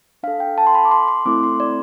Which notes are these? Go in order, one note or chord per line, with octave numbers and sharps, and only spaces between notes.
D4 A4 F5
G5
A5
C6
B5
D6
C6
C6
A3 C4 E4 A4 D6
C6
D5